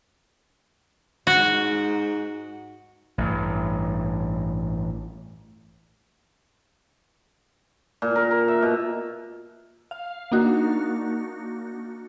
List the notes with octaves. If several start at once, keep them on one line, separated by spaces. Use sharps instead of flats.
G#2 F#4
A1 G2
A#2
A#4
A#4
E5
B2
F5
A#3 D4 D#4 F#4